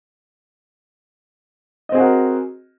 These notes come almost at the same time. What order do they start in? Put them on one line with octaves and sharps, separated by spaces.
D#5 C4 G#4 F#4 A#4